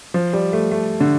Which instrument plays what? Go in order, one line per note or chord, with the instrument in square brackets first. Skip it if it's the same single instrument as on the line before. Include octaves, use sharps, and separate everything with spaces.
[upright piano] F3
G3
A3
A3
D3